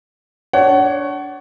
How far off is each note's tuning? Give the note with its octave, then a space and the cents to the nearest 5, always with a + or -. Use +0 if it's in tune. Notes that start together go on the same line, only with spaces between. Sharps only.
D4 -20 C#5 +0 F#5 +30